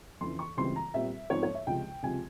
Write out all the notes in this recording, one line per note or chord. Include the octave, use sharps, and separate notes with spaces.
F2 C#3 E3 C6
C#6
C#2 C#3 E3 G3 C4 C6
A#5
A#2 G3 C4 E5
G#2 F3 C4 C#5
C#5
E5
C#2 C3 F3 G5
C#2 C3 F3 C4 G#5